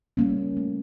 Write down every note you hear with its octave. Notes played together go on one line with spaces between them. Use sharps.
G3 A#3 C#4
A3